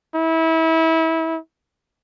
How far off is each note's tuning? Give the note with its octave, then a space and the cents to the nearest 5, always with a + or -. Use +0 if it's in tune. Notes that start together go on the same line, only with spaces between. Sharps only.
E4 -25